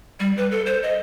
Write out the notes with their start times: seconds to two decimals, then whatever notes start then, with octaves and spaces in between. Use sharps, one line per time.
0.20 G3
0.37 B4
0.51 A4
0.66 C5
0.83 D#5